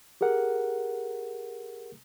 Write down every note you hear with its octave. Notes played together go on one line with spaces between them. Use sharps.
G4 G#4 A#4 F#5